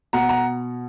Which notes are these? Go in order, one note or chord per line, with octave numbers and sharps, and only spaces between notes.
B2 F#5 A#5
F#5 A#5